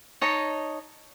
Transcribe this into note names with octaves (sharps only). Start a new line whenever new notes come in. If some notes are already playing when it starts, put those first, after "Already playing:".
D#4 C#5 D#5 A5